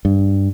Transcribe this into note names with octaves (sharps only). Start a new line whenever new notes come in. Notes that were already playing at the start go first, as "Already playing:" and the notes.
G2